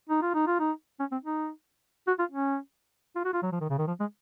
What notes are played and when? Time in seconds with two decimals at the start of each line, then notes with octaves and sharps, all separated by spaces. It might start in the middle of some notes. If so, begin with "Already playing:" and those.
0.09 D#4
0.22 F4
0.34 D#4
0.47 F4
0.59 D#4
0.99 C#4
1.12 C4
1.23 D#4
2.07 F#4
2.19 F4
2.31 C#4
3.15 F4
3.25 F#4
3.33 F4
3.43 F#3
3.52 F3
3.61 D#3
3.70 C#3
3.78 D#3
3.87 F3
4.00 G#3